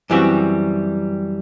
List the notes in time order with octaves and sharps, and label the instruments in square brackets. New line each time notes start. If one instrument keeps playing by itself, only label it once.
[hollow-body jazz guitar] F#2 E3 G3 C4 F#4